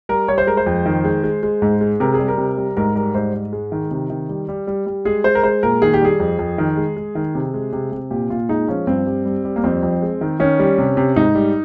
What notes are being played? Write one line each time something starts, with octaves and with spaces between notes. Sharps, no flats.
G3 A#4
G3 C#5
C5
G#3 A#4
C5
F2
D#3
G#3
G#3
G#3
G#2
G#3
C3 A#4
G#4
G3
A#4
C3
G3
G#2 A#4
G3 A#4
G#2 C5
G#2
G#3
D#3
C3
D#3
G3
G3
G3
G3
G#3 G#4
G#3 C5
A#4
G#3 C5
A#2 A#4
D#3 G#4
G4
G3 G#4
F2
F2
D#3
G#3
G#3
D#3
C3
G#3
C3
C3
A#2 G4
A#2 F4
G#3 D#4
F3 C#4
G2 C4
G3
G3
G3
A#3
F2 C4
F2
G#3
D#3
D#3 C#4
G3
C3
C3
G#2 D#4
G3